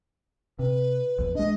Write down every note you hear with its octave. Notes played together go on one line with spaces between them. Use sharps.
C3 B4
A#1 E2
G#3 D4 D#5